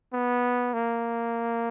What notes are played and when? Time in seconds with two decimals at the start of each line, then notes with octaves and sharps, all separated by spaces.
0.13 B3
0.74 A#3